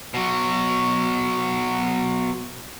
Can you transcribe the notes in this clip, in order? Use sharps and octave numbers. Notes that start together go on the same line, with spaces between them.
B2 F#3